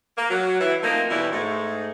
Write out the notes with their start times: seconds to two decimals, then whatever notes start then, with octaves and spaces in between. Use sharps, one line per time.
0.17 A#3
0.30 F#3
0.60 E3 E4
0.83 F3 A3 A#3 C4 D#4
1.09 B2 D3 E3 G3 C#4 E4
1.32 G#2 A3